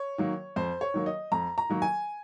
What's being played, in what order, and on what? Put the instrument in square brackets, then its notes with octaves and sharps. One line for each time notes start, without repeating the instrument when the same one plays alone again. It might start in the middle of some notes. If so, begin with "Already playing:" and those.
Already playing: [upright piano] C#5
D#3 F#3 A#3
F2 C5
C#5
D#3 F#3 A#3
D#5
F2 A#5
A#5
D#3 F#3 A#3
G#5